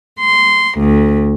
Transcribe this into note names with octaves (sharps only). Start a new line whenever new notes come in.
C6
D2